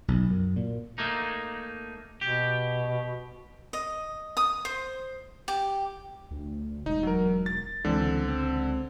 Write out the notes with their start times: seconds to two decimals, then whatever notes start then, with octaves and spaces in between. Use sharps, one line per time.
0.08 B1
0.31 F#2
0.56 A#2
0.98 A3 A#3 D#4
2.21 B2 G4
3.73 D#5
4.37 D#6
4.65 C5
5.48 G4
6.31 D2
6.86 E1 D#4
7.03 F#3 A#4
7.46 A6
7.85 C#2 D3 E3 C4
8.28 C4